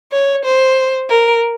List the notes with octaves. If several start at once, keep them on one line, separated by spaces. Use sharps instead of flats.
C#5
C5
A#4